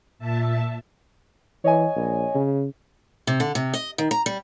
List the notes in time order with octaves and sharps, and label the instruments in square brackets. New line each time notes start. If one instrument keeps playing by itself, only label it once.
[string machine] A#2 E5 A5
[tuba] E3 [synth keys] C#5 D#5 G#5
[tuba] A#1
C#3
[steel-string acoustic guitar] C3
D3
C3
D#5
D#3
A#5
G3